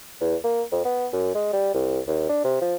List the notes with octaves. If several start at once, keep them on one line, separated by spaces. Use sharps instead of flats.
E2
A#3
F2
B3
F#2
G#3
G3
C2
D#2
D4
C3
F3